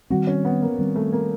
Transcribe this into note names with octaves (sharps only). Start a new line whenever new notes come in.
D#3 G3 C4 F#4
C#4
B3
A#3
D#3 G3 C4
A3
A#3